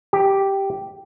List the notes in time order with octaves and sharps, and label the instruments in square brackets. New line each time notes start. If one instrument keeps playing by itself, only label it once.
[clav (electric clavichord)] G4